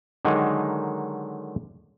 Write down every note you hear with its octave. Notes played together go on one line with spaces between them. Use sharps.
D3 D#3 F#3 G#3 D#4